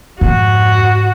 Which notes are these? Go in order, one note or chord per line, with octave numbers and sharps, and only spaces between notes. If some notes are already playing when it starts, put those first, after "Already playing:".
F2 G#2 C#3 F#4